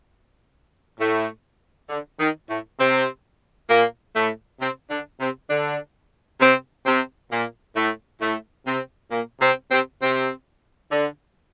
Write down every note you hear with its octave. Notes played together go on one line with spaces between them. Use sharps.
A2 A3
D3
D#3
A2 A3
C3 C4
A#2 A#3
A2 A3
C3 C4
D3 D4
C3 C4
D3 D4
C3 C4
C3 C4
A#2 A#3
A2 A3
A2 A3
C3 C4
A#2 A#3
C3 C4
C3 C4
C3 C4
D3